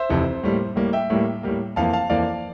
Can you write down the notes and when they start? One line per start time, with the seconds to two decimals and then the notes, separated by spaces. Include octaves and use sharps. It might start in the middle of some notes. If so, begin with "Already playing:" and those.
Already playing: C5 E5
0.10 F1 F2 C3 E3
0.43 A2 G3 A#3
0.76 A2 G3 A#3
0.93 E5 G5
1.10 A2 G3 A#3
1.43 A2 G3 A#3
1.76 F2 E3 A#3 F5 A5
1.93 F5 A5
2.10 F2 E3 A#3 D5 F5